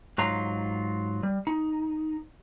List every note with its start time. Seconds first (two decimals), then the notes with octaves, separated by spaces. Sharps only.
0.18 G#2 F#3 F4 A#5
1.23 G3
1.47 D#4